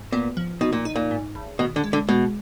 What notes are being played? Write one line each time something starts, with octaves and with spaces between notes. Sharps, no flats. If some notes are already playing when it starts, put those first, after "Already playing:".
Already playing: G#2
A#2 B3
F3
B2 D#4
A#2
D#4
A#2
G#2
G#1
B2 D#3
D3
G#3
D3
B2 G#3